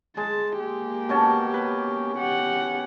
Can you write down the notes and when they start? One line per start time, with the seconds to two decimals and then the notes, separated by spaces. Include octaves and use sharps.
0.17 G#3 A5
0.59 A#3 G4
1.09 B2 C#4 A5
1.54 B4
2.18 G4 F#5